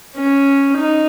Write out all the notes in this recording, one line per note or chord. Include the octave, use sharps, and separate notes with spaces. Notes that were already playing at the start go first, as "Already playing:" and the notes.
C#4
D#4